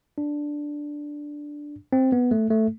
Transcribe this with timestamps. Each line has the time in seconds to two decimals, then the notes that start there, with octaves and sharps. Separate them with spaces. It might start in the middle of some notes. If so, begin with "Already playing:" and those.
0.18 D4
1.93 C4
2.12 B3
2.31 A3
2.50 A3